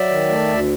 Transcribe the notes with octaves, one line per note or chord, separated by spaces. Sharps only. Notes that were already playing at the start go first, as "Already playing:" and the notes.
Already playing: F#3 D5 E5
D#3
A3
D2